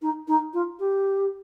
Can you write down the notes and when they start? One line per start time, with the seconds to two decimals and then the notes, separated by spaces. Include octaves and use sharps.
0.01 D#4
0.27 D#4
0.53 F4
0.79 G4